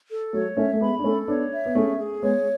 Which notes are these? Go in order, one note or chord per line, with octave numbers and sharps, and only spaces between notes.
A4
F#3 A3 C#5
A3 C#4 E5
A3
G#3 B3 B5
D4
A3 C#4 A4
B3 D4 C#5
E5
B3
A3 C#4 G#4
G#4
G#3 B3 C#5